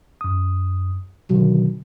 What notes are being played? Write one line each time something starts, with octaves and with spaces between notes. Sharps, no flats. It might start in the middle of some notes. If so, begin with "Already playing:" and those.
F#2 D#6
B2 D3 D#3 F#3